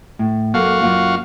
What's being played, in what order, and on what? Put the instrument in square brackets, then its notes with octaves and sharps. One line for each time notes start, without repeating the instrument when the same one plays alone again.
[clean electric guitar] A2
[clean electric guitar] F#2 A#3 A4 [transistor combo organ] F#4 F5
[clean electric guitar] F#2 A#3 F4